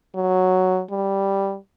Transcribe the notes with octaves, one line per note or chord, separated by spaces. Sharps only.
F#3
G3